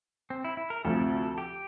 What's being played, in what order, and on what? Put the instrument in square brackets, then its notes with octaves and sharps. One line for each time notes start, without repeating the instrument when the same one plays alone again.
[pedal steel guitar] C4
E4
E4
A#4
[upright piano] D2 C3 F3 [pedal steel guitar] A4
[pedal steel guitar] G4